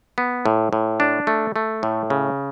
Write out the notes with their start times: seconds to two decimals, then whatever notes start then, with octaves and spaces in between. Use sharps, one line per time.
0.18 B3
0.46 A2
0.73 A2
1.00 D4
1.27 A3
1.56 A3
1.83 A2
2.10 C#3